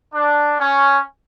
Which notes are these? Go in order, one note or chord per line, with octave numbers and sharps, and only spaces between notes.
D4
C#4